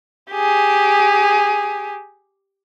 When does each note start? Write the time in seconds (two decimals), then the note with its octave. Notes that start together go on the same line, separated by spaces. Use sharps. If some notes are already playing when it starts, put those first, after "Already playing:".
0.31 G4 G#4